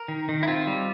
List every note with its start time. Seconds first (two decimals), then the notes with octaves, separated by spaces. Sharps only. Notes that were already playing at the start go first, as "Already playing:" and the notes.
Already playing: A#4
0.08 D#3
0.29 D#3
0.43 E4
0.48 C4 F4
0.67 G3